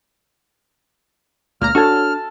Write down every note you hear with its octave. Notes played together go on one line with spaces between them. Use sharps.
C#2 A#2 A#3 A#5 F6
D4 F#4 A4 C#5 A5